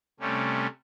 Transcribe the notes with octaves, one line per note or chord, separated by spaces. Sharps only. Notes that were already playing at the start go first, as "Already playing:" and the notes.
C3 G3 A3 C#4